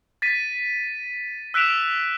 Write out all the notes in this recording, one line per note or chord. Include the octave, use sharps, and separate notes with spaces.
A6 B6 D#7
E6 F#6 B6 D7 E7 F7